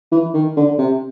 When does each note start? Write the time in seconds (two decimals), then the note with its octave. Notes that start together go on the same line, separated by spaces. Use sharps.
0.12 E3
0.34 D#3
0.56 D3
0.78 C3